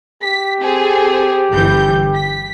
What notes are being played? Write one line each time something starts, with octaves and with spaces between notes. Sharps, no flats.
G4 B6
C4 G#4 A4
G1 E3 G6
B6